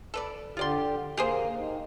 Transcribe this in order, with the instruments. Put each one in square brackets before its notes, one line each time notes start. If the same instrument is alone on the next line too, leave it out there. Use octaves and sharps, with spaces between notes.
[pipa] A4 B4 D5
[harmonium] D3 G4 [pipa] F4 D5 C6
[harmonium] A#3 [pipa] G4 G#4 C5
[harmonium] D#3